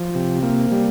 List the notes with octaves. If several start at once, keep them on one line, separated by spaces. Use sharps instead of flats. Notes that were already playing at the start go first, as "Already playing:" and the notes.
Already playing: F3
C3
A#3
G3